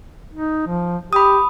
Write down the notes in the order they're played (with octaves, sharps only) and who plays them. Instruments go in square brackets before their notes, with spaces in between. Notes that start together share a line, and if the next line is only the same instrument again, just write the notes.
[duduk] D#4
F3
[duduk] G4 [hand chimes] B5 D#6